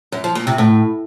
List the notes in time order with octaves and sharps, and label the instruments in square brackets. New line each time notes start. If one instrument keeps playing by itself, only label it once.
[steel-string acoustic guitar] F#2
F3
A#2
C3
A2